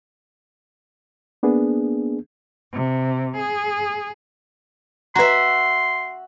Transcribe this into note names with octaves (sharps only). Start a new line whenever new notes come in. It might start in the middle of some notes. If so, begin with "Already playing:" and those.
A#3 B3 D4 G#4
C3
G#4
F#4 B4 E5 A#5 C6